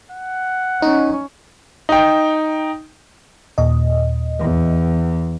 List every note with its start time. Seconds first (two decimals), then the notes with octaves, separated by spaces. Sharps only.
0.11 F#5
0.82 C#4 D#4
1.89 D#4 G5
3.58 D#2 A#2 D#5
4.40 E2